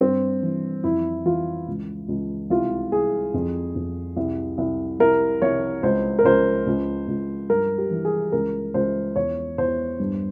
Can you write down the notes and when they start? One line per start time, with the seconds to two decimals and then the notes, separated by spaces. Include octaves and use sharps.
0.01 G2 C4
0.43 E3
0.84 F2 E4
1.25 E3 F4
1.68 C#2
2.08 C#2
2.50 C2 F4
2.92 C2 G#4
3.34 F2
3.75 F2
4.17 C2
4.58 C2
5.00 C2 A#4
5.42 C2 C#5
5.83 C#2 C5
6.19 A#4
6.24 C#2 C5
6.67 C#2
7.08 C#2
7.49 G2 A#4
7.78 G4
7.91 E3
8.05 G#4
8.32 C#2 A#4
8.74 C#2 C5
9.16 E2 C#5
9.58 E2 C5
10.00 G2